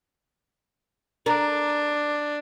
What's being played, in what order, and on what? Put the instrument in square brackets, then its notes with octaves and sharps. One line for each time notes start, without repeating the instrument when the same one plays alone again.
[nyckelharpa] D4 [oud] A#4